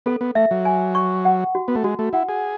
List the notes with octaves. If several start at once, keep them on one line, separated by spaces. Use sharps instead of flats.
B3 A4
B3
A3 E5
F#3
G#5
C#6
F#5
F#4
B3
A3
G#3 F#4
A3
E4 F#5
G#4